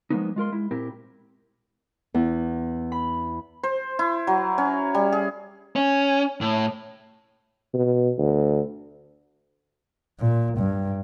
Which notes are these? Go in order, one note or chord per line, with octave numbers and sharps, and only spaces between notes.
F3 F#3 G#3 A#3 B3 D#4
G#3 F4 A#4 C6
G#3 E4
A#2 C4 E4 G4 A#4
E2
B5
C5
E4
F#3
C#4
G3
G#4
C#4
A2
B2
D2
A#2
G2